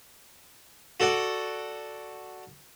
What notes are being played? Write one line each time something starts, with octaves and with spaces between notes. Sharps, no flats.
F#4 A4 D5 F#5